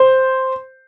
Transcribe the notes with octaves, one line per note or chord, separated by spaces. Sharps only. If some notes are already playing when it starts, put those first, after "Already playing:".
Already playing: C5